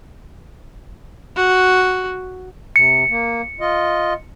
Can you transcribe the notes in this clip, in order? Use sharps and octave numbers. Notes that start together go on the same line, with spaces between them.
F#4
C3 C#7
A#3
F4 D#5